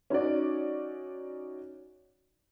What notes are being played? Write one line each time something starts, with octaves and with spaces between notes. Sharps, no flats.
C#4 D#4 F#4 D5